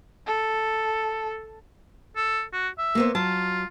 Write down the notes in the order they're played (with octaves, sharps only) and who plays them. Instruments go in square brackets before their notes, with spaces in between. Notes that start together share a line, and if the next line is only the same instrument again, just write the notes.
[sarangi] A4
[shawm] A4
F#4
E5
[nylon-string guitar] A#3 B3 C5
[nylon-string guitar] F#3 A5 [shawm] F4